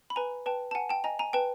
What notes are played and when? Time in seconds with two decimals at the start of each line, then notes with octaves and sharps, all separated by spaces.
0.10 B5
0.16 B4 G#5 A#5
0.46 B4 G5 A5
0.71 A5
0.75 F#5 G#5
0.89 G5 A5
1.04 D#5 G#5 A#5
1.19 G#5 A#5
1.33 B4 G5 A5